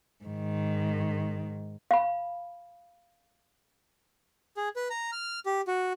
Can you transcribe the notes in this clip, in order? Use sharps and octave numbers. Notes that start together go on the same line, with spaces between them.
G#2 D#3
F5 B5
G#4
B4
A#5
F6
G4
F#4